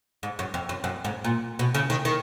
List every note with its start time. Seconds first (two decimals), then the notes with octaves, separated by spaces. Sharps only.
0.23 G#2
0.39 F#2
0.54 F2
0.69 F#2
0.84 F#2
1.05 G#2
1.24 A#2
1.59 B2
1.74 C#3
1.90 D#3
2.05 D#3